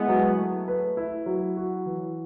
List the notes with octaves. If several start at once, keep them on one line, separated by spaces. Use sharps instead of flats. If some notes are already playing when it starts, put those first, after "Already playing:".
Already playing: G#3 B3 E4
F#3
A3
B4
E4
F#3
F#4
E3